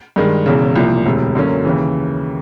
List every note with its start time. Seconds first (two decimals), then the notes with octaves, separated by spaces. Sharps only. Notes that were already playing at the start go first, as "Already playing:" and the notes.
0.16 G2 D#3 G#3
0.46 E1 E2 C#3
0.76 C2 A#2 F3
1.06 E1 D2 C3
1.35 F#2 D3 F#3 A#3 C#4
1.65 D#2 C#3 E3